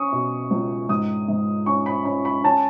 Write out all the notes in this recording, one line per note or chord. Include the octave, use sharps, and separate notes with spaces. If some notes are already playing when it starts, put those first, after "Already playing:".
Already playing: C#4 C#6 D#6
B2
C#2
G#2 D#6
G#2
C#4 C#6
B5
C#4 B5
B5
C#4 A5